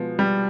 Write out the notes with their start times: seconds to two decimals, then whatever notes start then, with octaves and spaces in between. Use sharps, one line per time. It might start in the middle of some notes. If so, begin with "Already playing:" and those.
Already playing: B2 F3 G#3 B3
0.19 G3